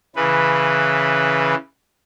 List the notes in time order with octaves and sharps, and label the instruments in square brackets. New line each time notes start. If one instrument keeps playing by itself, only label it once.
[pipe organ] C#3 E3 B4